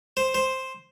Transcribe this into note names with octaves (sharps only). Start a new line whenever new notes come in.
C5
C5